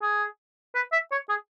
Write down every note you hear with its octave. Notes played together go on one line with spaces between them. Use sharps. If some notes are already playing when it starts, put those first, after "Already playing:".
G#4
B4
E5
C#5
G#4